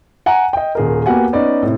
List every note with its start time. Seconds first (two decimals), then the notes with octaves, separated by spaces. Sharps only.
0.26 F#5 G#5 A#5
0.53 D#5 G5
0.75 D#1 G#4 A#4
1.06 A#3 B3 F#4 G4 F#5 G#5
1.33 B3 C#4 D#4 D5
1.62 A2 C3